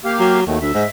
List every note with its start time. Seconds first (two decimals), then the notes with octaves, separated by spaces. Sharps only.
0.05 A#3 G4 F5
0.20 F#3
0.47 D#2 D#3 F#3 A3
0.61 D2 E5
0.74 G#2